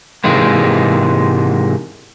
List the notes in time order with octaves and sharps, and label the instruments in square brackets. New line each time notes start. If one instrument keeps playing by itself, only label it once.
[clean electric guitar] G#2 C3 E3 G#3 A#3